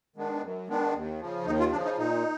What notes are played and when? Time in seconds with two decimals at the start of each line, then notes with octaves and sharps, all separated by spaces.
0.16 D#3 G#3 B3 D4
0.42 F#2
0.68 D#3 G#3 B3 D4
0.94 D#2
1.20 C#3 F3
1.46 D#2 D#4
1.60 F4
1.72 C#3 F3 D4
1.85 D#4
1.98 A#2 D#4